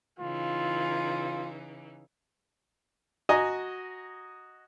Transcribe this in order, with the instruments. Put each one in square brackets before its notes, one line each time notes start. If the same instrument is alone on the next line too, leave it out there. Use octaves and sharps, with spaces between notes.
[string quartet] C#3 E3 D#4 [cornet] F4
[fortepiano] F#4 D#5 G#5 A#5